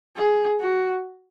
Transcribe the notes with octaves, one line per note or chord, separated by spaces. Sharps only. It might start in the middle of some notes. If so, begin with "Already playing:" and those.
G#4
F#4